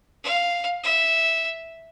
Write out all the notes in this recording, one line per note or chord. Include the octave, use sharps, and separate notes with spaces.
F5
E5